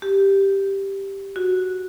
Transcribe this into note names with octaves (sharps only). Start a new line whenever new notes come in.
G4
F#4